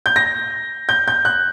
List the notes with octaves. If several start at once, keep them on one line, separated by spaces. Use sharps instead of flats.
G6
A#6
G6
G6
F#6